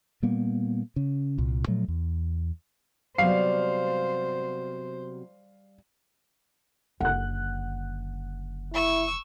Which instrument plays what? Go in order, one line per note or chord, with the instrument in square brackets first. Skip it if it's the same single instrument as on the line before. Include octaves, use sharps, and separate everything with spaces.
[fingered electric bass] A#2 G3 A#3 B3
C#3
C2 A#2
A#2 F3 F#3 A3
E2
[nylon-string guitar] C3 F#3 B3 [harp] G3 [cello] C5 [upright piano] F5 C7
[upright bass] F#1 D3 [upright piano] F#5 F#6
[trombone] E4 [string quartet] C#6 E6